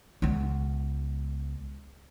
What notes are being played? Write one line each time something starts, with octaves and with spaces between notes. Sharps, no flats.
C#2 B3